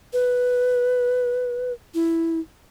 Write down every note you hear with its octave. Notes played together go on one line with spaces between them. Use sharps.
B4
E4